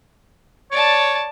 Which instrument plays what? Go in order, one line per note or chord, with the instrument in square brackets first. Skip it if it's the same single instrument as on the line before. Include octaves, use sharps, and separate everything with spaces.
[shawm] C#5 [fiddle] D5 A5